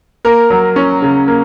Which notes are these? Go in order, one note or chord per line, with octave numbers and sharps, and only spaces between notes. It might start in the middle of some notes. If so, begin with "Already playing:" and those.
A#3 A#4
F#3
C#4
C#3
A#3